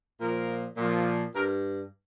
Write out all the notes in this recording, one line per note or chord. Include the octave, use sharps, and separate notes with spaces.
A#2 F3 A#4
A#2 F3
G2 A#4